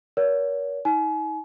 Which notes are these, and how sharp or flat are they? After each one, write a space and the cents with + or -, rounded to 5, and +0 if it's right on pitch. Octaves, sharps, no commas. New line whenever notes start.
A#4 +30 C#5 +35 F#5 +0
D#4 +40 G#5 +35